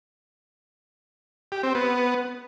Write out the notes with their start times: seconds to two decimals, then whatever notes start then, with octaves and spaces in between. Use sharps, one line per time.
1.52 G4
1.63 C4
1.75 B3